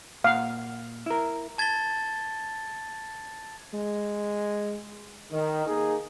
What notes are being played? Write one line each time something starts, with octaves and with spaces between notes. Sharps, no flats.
A#2 F5 F#5
E4 A#4
A5 G#6 A6 B6 G7
G#3
D#3
A#3 D#4 G#4